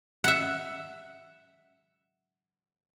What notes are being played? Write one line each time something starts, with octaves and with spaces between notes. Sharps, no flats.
E5 F#5